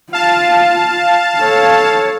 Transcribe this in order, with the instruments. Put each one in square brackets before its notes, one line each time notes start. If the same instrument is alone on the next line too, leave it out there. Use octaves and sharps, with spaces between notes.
[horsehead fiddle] F4 [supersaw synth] F5 A5
[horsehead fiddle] A4 C#5